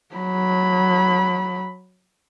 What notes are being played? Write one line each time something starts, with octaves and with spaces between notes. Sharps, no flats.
F#3 B5